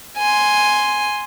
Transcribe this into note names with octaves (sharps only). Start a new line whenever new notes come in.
G#5 C6